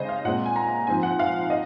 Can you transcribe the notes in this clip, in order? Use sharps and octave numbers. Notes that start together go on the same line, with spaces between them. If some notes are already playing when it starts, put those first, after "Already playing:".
Already playing: C#3 G#3 C4 C5 D#5
F5
A#2 G#3 C4 F#5
G#5
A#5
G#2 F3 C4 G#5
F#5
F5
D#5